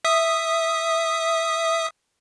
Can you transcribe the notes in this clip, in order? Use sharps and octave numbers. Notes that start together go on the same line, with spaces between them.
E5 D#6